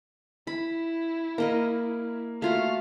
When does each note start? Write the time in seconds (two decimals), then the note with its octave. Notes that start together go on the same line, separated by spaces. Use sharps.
0.47 E4 B5
1.38 A#3 A#4 D#5 A#5
2.42 A3 F4 F#4 F5